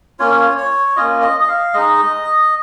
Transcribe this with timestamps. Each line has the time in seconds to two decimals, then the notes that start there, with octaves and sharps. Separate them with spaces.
0.19 A#3 C#4 F4 C#5
0.58 C#5
0.96 A#3 C#4 F4 D#5
1.22 D#5
1.40 D#5
1.48 F5
1.73 G#3 D#4 D#5